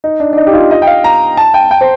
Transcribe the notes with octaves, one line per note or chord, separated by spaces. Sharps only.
D#4
D4
D4
D#4
G4
F4
D#5
G5
F5
A#5
A5
G5
G5
C5